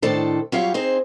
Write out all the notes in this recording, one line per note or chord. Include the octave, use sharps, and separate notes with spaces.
A2 D#3 D4 A4 C5
F#3 G3 F4 G4 C#5 F5
C4 D#4 G#4 C5